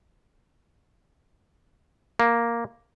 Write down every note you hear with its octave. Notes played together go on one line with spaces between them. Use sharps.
A#3